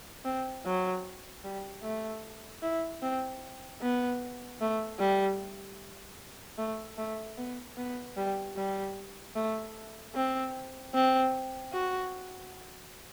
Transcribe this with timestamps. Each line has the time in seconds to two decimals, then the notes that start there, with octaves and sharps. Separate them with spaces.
0.24 C4
0.65 F#3
1.44 G3
1.82 A3
2.62 E4
3.02 C4
3.81 B3
4.61 A3
4.99 G3
6.58 A3
6.97 A3
7.37 B3
7.77 B3
8.17 G3
8.56 G3
9.35 A3
10.14 C4
10.94 C4
11.72 F#4